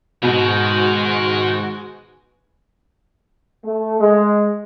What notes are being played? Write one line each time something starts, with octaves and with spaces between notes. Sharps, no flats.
G#2 B2 D#3 G#3 F#4 G#5
A3
G#3